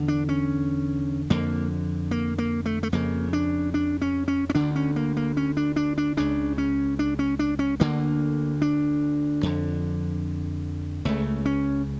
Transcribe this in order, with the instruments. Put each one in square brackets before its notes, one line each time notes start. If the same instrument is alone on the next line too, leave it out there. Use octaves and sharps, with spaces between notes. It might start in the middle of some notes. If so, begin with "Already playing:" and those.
Already playing: [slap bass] E2 D3
D4
C#4
F2 D3 A#3
A#3
A#3
A3
A3
F2 C#3 A#3
D4
D4
C#4
C#4
C#4
D2 D3 D4
C#4
A#3
A#3
C#4
D4
D4
D4
C#2 C#3 D4
C#4
D4
C#4
D4
C#4
D2 D3 A#3
D4
F2 D3
C#2 C#3 A3
C#4